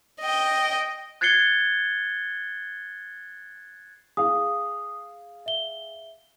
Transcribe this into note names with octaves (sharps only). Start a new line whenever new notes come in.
D#5 G5
F#6 G#6 A6 C7 C#7 G7
G#4 F5 D#6
E5 G7